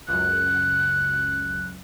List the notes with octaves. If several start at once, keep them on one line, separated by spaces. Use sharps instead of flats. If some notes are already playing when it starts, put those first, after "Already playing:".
C#2 F#2 F#6